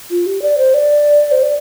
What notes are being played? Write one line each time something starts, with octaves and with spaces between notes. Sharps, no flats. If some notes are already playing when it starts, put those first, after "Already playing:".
F4
G4
D5
C5
D5
C5
D5